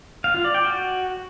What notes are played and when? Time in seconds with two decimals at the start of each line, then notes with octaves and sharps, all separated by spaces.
0.24 F5
0.34 F4
0.44 D5
0.54 G5
0.65 F#4